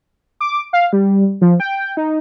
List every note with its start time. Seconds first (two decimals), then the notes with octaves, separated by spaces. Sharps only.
0.40 D6
0.73 F5
0.93 G3
1.41 F3
1.60 G5
1.97 D#4